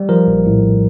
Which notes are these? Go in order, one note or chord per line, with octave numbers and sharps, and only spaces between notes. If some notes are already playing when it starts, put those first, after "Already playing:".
Already playing: G3
F3 A#4
A#1
A2